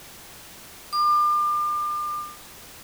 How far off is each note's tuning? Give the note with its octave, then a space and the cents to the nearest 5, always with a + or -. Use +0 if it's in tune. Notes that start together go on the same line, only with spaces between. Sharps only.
D6 +35